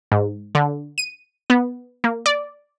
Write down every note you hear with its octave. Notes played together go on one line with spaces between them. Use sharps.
G#2
D3
D#7
B3
A#3
D5